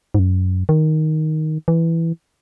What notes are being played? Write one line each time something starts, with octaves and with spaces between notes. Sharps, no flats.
G#2
F#2
D#3
E3